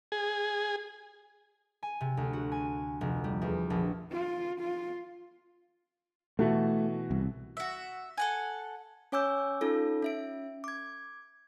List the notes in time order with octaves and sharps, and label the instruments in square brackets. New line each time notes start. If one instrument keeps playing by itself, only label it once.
[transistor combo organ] G#4
[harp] G#5
C3
D2
F#4
G#5
F1
G3
E2
A#1
[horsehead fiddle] F4
F4
[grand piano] B2 E3 F#4 [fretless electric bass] A3
[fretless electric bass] C2
[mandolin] F#4 E5
A4 F#5 G#5
[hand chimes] C#4 C#5 G#5 D6 E6 G6
C#4 D#4 F4 A4
C#4 E5 D7
D6 G#6